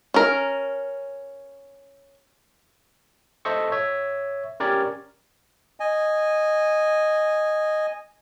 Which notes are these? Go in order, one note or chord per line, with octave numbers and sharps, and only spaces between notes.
C#4 A#4
A4 C5 D#5 E5 C#6
C#5 E5
C#4 G4 A#4 C#5 D5
D#5 G#5